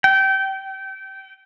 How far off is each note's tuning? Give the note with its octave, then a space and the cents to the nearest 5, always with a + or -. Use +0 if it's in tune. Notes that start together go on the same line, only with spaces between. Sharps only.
G5 -25